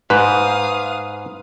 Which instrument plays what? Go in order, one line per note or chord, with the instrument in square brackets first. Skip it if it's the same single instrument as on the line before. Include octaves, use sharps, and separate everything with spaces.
[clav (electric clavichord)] G#2 [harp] B4 [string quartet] F5 D#6